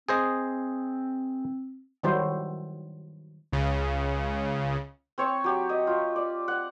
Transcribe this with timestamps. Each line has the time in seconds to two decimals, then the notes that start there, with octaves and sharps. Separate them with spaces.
0.09 C4 G#4 C5 D#5
2.03 D#3 F#3 G3 E4 C5
3.53 C#2 C#3
5.18 C4 C#5 C#6
5.44 F#3 G4
5.69 D#5
5.87 F4
6.16 D5
6.48 F#5